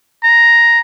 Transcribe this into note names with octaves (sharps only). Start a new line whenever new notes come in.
A#5